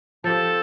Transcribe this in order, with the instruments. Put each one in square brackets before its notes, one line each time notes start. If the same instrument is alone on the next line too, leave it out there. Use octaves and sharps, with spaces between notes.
[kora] F3 C4 G4 [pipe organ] A4